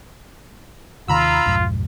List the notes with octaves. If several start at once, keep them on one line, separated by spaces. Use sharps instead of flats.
D#2 C3 D#3 F4 A#5 B5 E6
B1 F2 G#2